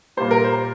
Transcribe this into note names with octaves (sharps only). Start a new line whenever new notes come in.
A#2 G3 C5
A#4
C5